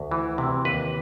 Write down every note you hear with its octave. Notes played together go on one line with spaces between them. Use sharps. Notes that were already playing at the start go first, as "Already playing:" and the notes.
Already playing: D2
E3
C3
D#2 B4